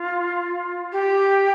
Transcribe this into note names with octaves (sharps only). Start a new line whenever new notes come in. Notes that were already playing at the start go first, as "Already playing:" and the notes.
Already playing: F4
G4